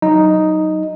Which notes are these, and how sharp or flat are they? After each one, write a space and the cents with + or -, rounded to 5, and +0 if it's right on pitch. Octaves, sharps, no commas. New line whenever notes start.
F#3 +15 D#4 +0 D#5 +0